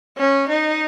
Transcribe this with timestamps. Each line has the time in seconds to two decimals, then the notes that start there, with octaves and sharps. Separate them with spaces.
0.17 C#4
0.49 D#4